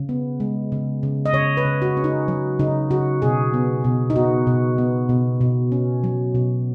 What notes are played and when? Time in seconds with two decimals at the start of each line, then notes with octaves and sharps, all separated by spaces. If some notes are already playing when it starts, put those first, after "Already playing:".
Already playing: C#3
0.09 B3
0.40 G#3
0.72 C#3
1.03 C#3
1.26 D#5
1.34 C#3 C#5
1.57 B4
1.65 C#3
1.82 F#4
1.97 C#4
2.04 D#4
2.28 F#3
2.59 C#3 D#4
2.90 C#3 F#4
3.22 B2 G#4
3.54 B3
3.84 B2
4.10 D#4
4.16 B3 F#4
4.47 B2
4.78 B3
5.09 B2
5.41 B2
5.72 C#4
6.04 F#3
6.35 B2